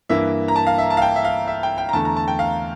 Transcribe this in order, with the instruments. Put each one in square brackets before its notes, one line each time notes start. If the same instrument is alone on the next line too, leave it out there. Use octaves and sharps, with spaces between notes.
[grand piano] G2 E3 A#3 E5
A#5
A5
F5
E5
A5
F5
G5
E5
F5
E5
G5
G5
A#5
E2 D3 A3 A5
A#5
A5
G5
F5